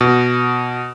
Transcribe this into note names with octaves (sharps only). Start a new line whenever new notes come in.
B2